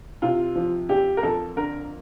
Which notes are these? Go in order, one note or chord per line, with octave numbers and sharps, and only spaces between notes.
C3 F4
F3
F2 G4
A#4
F2 A4
D3 A#4